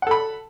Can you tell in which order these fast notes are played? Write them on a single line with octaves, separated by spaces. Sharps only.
F#5 A4 B5